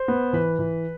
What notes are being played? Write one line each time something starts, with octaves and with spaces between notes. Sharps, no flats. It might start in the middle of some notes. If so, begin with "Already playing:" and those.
Already playing: C5
B3
E3 B4
E3